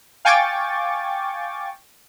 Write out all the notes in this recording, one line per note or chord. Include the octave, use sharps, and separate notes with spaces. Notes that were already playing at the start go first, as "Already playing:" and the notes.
F5 G5 G#5 C#6 D6 A6